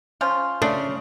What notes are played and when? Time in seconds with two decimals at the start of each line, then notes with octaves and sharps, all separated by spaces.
0.21 F3 C#4 F4
0.62 C#3 A3 D4